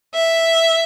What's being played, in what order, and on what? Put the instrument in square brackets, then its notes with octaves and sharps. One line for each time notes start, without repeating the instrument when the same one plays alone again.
[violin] E5